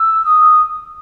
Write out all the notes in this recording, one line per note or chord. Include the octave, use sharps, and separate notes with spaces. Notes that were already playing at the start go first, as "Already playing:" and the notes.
Already playing: E6
D#6